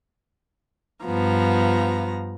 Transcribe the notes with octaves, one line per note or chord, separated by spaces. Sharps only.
G2 F3 B3 A#5